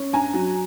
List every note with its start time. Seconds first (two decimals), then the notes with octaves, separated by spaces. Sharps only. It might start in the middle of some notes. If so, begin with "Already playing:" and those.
Already playing: C#4
0.13 G2 G#5 A#5
0.34 F#3